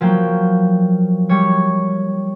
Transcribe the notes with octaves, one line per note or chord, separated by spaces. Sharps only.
F3 F#3 A#3 G5
G3 C#5